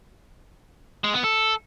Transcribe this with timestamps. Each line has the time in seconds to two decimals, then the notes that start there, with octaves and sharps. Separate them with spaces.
1.04 G#3
1.14 B3
1.24 A4